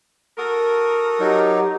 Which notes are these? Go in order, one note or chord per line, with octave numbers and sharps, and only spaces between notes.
F#4 A4 A#4 D#6
F#3 D#4 G4